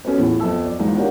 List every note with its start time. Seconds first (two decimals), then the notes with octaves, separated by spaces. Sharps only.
0.05 B3 C#4 F#4 A4 B4
0.18 E2 A2 F3
0.40 F2 B3 E5 A5 E6
0.65 D5
0.79 G#1 E2 D#3 G#3 D#4 F4
0.95 D4 G4 A#4 C#5 F5 F#5